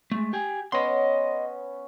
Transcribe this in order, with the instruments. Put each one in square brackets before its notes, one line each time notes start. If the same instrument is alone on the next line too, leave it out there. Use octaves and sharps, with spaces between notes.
[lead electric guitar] G#3 A3
G4 G#5
[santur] B3 C#4 [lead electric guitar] D#5 C6